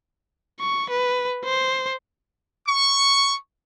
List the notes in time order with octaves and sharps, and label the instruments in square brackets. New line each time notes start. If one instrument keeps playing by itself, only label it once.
[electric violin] C#6
B4
C5
[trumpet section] C#6